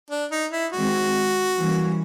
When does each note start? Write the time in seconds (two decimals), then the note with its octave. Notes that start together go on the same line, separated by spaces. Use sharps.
0.10 D4
0.31 D#4
0.52 E4
0.72 D#3 G#3 C4 F#4
1.57 E3 G3 A#3 C#4